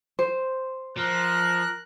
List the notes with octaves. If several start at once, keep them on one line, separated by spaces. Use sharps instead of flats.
C5
F3 A#4 F#6